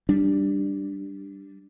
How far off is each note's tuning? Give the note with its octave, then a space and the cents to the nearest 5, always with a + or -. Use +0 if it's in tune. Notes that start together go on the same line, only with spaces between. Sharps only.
G3 +0 D4 +0